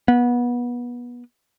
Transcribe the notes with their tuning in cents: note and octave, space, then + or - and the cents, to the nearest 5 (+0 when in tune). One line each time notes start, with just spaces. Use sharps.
B3 -25